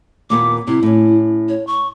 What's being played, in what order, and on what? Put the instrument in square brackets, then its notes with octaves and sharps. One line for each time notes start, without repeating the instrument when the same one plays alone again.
[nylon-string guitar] D#2 A#2 B3 [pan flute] D6
[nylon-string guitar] C3 [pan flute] E4
[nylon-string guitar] A2 C#4
[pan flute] C#5
C#6